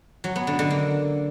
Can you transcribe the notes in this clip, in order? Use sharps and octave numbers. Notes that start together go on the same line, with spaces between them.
F#3
B3
D3
D3
A#3